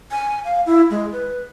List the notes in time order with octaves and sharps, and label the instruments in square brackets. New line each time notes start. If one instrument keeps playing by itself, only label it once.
[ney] G#5
F5
E4
G#3
B4